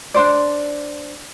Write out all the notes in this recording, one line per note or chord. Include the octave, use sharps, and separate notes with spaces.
D4 D#4 C5 D5